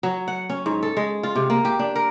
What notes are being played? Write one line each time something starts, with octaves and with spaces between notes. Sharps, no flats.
F#3
F#5
C#4
G#2
A4
G#3
F4
C3
A#3
G4
D4
A#4